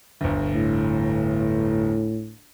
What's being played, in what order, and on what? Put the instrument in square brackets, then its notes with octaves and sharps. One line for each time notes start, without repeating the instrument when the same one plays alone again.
[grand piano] G1 D2
[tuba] A2